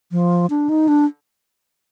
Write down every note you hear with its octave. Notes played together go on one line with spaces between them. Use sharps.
F3
D4
D#4
D4